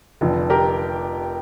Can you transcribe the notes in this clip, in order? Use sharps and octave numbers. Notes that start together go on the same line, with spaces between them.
F1 F2 D3 F3
G4 A#4